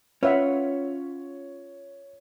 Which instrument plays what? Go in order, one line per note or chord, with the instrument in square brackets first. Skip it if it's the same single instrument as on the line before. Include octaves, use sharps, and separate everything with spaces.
[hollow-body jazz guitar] C#4 F4 [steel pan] B4 E5 F#5 [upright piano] C#5